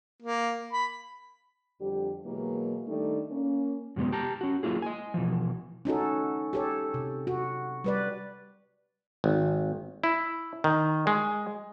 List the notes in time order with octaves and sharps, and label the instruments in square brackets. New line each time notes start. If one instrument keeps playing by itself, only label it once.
[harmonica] A#3
B5
[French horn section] F2 D3 G3 G4
B2 E3 F#3 G#3 A#3
D#3 G3 A3 D4 D#4
A#3 C#4
[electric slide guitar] F#2 C3 G#3 B3
G4 A5 A#5
C#4 F#4
F#3 A#3 E4 F4 G#4
D#5 G#5
B2 E3 F3
[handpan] C#4 D#4 F#4 A4
G4 A4 C#5
C3
F#4
G3 B4 D5
[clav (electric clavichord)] G#1
E4
D#3
G#3